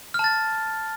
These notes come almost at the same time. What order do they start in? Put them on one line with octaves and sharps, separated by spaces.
F6 A5 A6